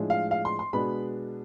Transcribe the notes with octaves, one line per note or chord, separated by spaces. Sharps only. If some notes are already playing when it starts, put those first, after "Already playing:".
Already playing: A2 F3 G#3 D4
F5
F5
C6
C6
B2 G#3 B3 D4 B5